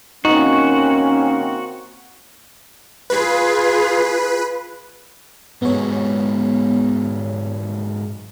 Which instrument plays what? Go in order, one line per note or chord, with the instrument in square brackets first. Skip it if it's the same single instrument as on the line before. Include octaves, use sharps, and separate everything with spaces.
[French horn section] D#3 A#3 C4 [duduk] C#4 [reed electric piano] D#4 [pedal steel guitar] F#4
[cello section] F4 G#4 [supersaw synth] B4
[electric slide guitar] G#2 F#3 G#3 [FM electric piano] B3 C#5